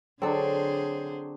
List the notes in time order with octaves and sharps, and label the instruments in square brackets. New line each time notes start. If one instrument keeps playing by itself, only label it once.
[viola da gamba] D3 G#4 C5 [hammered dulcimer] F#3 D4 [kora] C4 A4